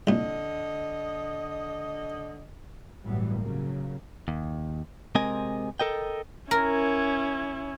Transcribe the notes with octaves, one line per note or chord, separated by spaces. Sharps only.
C2 A#2 D3 D#5
G1 A2 E3 F#3 G3 B3
C#3 F#3 A#3
D#2
C3 G#3 C4 A#4 D#5 G#5
A4 A#4 D#5 G5
C#4 E4 A#4